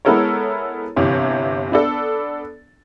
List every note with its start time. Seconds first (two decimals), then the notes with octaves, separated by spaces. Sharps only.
0.05 G#3 B3 E4 A4 A#4 C#5
0.96 G1 C3 E3 C#5
1.72 B3 D4 A4